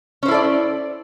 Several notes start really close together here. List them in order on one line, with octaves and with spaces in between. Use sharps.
C#4 C5 E4 A4 D5